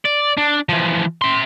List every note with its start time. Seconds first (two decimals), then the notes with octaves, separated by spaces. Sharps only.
0.05 D5
0.38 D4
0.69 E3 F3
1.21 E5 C6